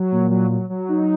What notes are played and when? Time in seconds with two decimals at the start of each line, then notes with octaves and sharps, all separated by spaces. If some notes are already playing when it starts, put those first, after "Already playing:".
Already playing: F#3
0.12 A#2
0.31 F#3
0.50 F#3
0.70 F#3
0.89 D#4